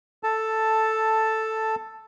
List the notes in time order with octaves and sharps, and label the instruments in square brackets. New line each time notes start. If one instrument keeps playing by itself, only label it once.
[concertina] A4 A5